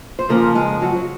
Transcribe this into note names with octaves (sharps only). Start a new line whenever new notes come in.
C5
F2 C#3 F3 A#3 A#4
G#3 G#4
F#3 F#4